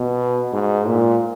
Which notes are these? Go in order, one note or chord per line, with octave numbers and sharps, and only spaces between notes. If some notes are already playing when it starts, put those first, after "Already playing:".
Already playing: B2
G#2
A#2